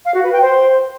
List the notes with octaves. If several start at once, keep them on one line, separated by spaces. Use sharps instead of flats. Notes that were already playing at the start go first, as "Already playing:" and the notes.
F5
F#4
B4
G5
C5